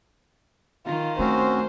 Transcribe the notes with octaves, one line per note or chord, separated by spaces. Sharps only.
D#3 F4
A3 C4 C#4 F#4 C5